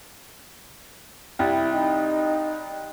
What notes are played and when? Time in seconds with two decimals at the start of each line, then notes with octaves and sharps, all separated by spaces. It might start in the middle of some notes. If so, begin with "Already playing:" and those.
1.39 C2 E4
1.74 D#4